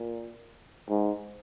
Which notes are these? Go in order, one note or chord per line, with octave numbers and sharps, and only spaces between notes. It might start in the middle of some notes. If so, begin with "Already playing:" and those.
Already playing: A#2
G#2